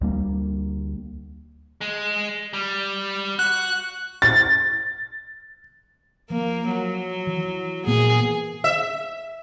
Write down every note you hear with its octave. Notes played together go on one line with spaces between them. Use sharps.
D2 G3 A#3
G#3
G3
F#4 F#6
A6
F3 A#3
F#3
E3
A#2 A#3 B3 G#4
E5